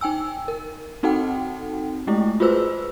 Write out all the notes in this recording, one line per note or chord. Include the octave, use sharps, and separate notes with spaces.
D#4 G5 G#5 E6
A#4
C4 D#4 F#4 A4 F#5 G5
G#3 A3 E4 G4
F4 F#4 G#4 B4 C5 E6